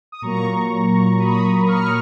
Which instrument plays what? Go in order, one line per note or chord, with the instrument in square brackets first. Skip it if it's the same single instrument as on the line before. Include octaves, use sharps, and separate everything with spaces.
[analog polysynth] D#6
A#2 F#3 A#3 A#5 C#6
B5 D#6
C#6 F6